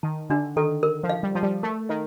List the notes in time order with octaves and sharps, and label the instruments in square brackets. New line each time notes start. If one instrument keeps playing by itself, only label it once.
[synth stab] D#3 [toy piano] A5
[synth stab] D3 [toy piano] D4
[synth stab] D#3 [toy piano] A4
[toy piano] A#4
[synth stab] F3
[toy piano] F5
[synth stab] G3
[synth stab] F3 [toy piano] A5
[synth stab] G3
[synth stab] A3 [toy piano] A#4
[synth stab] D#3 [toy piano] F5